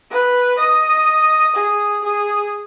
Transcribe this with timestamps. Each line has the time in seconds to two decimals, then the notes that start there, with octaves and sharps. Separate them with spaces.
0.10 B4
0.59 D#5
1.55 G#4
2.04 G#4